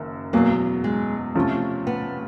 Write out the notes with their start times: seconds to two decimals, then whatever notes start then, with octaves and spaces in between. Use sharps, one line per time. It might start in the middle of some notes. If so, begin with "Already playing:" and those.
Already playing: F#1 F#2 D#3
0.33 E2 B2 F#3 A#3
0.84 G#3
1.35 C3 F3 A3 C#4
1.87 B3